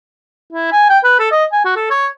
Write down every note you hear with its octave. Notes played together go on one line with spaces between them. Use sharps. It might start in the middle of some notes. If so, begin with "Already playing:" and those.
E4
G#5
G5
B4
A4
D#5
G#5
F#4
A4
C#5